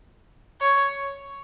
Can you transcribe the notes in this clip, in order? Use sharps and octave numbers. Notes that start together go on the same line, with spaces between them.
C#5